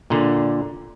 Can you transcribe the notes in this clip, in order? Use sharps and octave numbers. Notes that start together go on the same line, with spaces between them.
A#2 D3